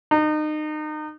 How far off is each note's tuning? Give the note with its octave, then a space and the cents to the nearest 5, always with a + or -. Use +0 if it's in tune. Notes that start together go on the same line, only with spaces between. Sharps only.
D#4 -30